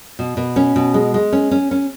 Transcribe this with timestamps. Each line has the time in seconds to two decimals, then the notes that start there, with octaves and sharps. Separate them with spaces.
0.19 B2
0.37 B2
0.56 C#4
0.76 B2
0.94 G#3
1.14 G#3
1.32 C#4
1.51 C#4
1.71 C#4